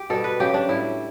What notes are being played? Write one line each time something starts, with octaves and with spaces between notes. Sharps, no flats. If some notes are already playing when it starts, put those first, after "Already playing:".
Already playing: G4
B2 G3 A4
B4
C#3 F#3 G4
D4
A2 G3 E4